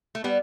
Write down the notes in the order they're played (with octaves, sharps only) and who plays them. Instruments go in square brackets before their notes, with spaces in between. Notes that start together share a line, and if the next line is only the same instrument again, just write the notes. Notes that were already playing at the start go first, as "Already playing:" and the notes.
[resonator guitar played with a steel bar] A3
G3 B3